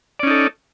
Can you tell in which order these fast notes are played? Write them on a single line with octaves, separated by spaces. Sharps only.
D5 C#4 D#4 A4